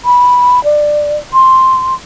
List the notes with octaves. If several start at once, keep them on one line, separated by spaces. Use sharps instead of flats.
B5
D5
C6